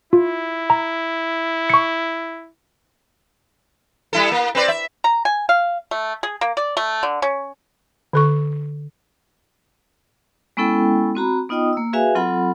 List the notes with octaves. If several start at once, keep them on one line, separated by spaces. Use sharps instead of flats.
E4 F4
A#5
C#6 C#7
G3 E4 A4
A#3
C4 B4 D5
E5
A#5
G#5
F5
A3
G#4
A#3
D5
A3
D3
C#4
D3 A4 C#6
G#3 B3 C#4 E4 A4 G5
C4 F#4 A#5 B5
B3 D#4 F4 D#5 G5 D#6
A#3 E6
F#4 G#4 B4 E5 F5 G#5
F#3 C4 F4 A4 F#5 B5